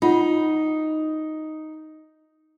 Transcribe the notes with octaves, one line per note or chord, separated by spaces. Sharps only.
D#4 F4 F#5